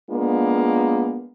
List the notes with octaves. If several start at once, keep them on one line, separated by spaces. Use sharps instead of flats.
G#3 A#3 B3 D4 F4